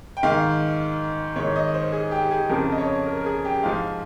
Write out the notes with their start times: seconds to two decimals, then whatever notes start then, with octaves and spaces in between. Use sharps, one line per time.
0.17 G5
0.23 G#2 D#3 F5
1.36 G#2 D#3 C#5
1.56 D#5
1.74 C5
1.92 G#4
2.11 G4
2.31 G#4
2.49 F2 C#3 F3 A#4
2.72 D#5
2.78 C#5
3.06 A#4
3.17 A#4
3.26 G#4
3.45 G4
3.63 G#2 F3 F5